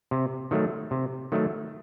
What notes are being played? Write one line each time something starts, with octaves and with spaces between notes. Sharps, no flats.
C3
D#3 F#3 A3
C3
D#3 F#3 A3